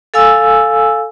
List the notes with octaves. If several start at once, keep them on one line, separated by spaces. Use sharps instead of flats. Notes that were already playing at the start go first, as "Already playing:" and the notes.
A4 F5 G#5 E6